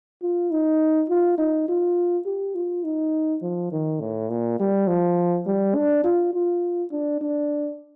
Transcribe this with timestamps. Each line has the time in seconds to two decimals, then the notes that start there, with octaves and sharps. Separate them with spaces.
0.22 F4
0.51 D#4
1.09 F4
1.38 D#4
1.68 F4
2.26 G4
2.55 F4
2.84 D#4
3.42 F3
3.72 D#3
4.01 A2
4.30 A#2
4.60 G3
4.88 F3
5.47 G3
5.75 D4
6.04 F4
6.34 F4
6.92 D4
7.21 D4